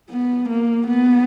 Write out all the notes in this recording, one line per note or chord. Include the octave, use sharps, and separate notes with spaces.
B3
A#3
B3